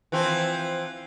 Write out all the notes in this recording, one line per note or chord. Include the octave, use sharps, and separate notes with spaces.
E3 F3 C4